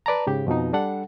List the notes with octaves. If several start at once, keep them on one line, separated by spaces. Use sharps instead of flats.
B4 D5 A5 A#5
G#2 C#3 G4
F2 B2 F3 D#4
G3 D4 A4 F#5